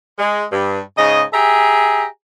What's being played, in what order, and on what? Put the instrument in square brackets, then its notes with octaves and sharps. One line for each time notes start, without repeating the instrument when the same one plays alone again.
[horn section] G#3
G2
G#2 C#3 D#5
G4 G#4 E5 A#5